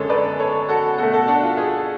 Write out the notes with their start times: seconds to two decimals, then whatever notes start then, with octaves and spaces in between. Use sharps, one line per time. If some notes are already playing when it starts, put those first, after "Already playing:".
Already playing: F#2 D3 G#3 A4 C#5
0.09 B4 D5
0.39 A4 C#5
0.69 F#4 A4
0.98 B2 A3 F#4 A4
1.13 F#4 A4
1.28 D4 F#4
1.43 F4
1.57 F4 G#4